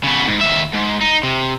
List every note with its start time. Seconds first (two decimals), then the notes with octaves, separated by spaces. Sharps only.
0.04 C#3 B3
0.28 G#2
0.41 D#2 E5
0.73 G#2
1.01 D#4
1.23 C3